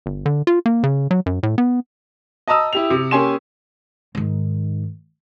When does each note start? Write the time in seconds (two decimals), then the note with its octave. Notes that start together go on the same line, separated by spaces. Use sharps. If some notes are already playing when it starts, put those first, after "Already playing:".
0.06 G1
0.26 D3
0.47 F4
0.66 A#3
0.83 C#3
1.11 F#3
1.26 F#2
1.43 A2
1.58 B3
2.48 D#5 A5 A#5 D#6 E6
2.73 E4 G4 F7
2.90 C3
3.11 A#3 C#4 G4 G#5 C6 E7
4.15 G#2 D#3